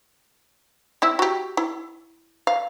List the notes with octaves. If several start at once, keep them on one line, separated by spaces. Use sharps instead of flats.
C4 E4 E5
F#4 G4
E4
F5